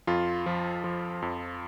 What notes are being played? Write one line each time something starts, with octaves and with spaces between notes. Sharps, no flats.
F2 F4
F3
F3
F2